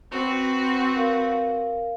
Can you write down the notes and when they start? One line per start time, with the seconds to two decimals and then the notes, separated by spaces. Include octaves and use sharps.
0.12 C4 F#4 B4
0.96 A#4 F5